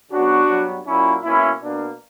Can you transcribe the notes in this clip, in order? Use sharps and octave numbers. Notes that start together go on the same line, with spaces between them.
C#3 F#3 B3 D4 F#4
G2 F#3 B3
A#2 F#3 A#3 C#4 E4
B2 A#3 C#4 E4
B2 A#3 D4